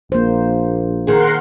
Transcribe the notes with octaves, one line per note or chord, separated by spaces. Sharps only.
A#1 A#3 C5
D#3 G#4 A#4 F#5 C6